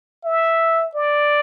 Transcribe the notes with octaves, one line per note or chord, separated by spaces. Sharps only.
E5
D5